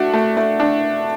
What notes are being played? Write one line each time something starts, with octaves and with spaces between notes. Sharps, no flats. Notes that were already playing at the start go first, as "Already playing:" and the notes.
Already playing: A3 D4 F#4
A3
A3
D4